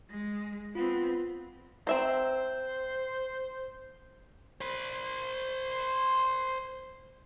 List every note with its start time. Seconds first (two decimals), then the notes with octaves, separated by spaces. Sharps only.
0.10 G#3
0.75 B3 C4 F4
1.87 C4 C5 E5 A#5
4.61 C5 B5